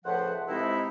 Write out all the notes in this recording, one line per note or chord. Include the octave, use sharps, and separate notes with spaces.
C#2 A2 F3 B4 C5 F#5
C3 F3 G#3 C4 D#4 E4